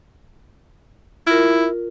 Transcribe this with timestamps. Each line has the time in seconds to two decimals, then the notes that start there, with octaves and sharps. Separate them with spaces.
1.27 E4 F4 A#4